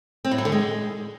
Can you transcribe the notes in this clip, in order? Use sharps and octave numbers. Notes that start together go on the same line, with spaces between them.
C4
A2
F#3
D3
G#3